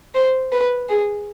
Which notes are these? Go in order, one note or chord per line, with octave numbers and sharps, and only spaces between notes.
C5
B4
G#4